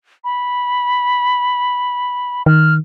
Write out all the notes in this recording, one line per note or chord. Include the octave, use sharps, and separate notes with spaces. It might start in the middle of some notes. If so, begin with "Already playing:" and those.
B5
D#3 F6